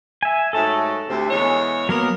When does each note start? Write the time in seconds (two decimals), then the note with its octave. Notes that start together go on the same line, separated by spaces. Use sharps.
0.23 E5 G#5
0.53 G#2 F#3 A3 A4 A5
1.08 D2 C3
1.30 E2 G#3 C#5
1.89 F#3 A#3 B3 A#4